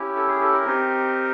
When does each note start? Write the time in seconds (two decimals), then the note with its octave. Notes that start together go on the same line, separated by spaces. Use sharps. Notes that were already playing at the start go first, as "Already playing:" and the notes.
Already playing: C#4 E4 G4
0.16 A4
0.29 G#4
0.41 A4
0.53 A#4
0.65 C4 D#4 G4